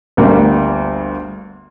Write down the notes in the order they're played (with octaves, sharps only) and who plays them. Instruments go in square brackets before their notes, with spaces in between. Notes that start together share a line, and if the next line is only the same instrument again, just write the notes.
[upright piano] G1 D2 G3 A#3